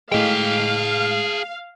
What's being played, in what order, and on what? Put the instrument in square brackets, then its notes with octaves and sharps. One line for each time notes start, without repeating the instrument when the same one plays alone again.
[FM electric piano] A2 G#3 [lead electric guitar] G#4 G5 [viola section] F5